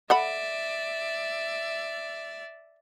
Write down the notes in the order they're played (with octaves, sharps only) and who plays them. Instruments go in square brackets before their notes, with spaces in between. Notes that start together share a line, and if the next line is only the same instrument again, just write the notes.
[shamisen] A4 F#5 B5 [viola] D5 E5